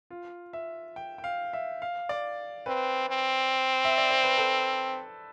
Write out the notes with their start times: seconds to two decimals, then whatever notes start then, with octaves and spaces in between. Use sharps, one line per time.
0.10 F4
0.53 E5
0.96 G5
1.18 G5
1.24 F5
1.53 E5
1.82 F5
2.09 D5
2.66 C4 B4
3.10 C4
3.85 E5
3.98 D5
4.11 C5
4.23 B4
4.38 A4